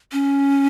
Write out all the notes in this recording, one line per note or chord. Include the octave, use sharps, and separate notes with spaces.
C#4